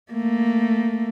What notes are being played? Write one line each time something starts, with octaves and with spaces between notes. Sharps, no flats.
A3 A#3